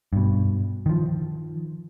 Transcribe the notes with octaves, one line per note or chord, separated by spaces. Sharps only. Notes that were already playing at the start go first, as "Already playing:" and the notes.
G2 B2
D#3 F3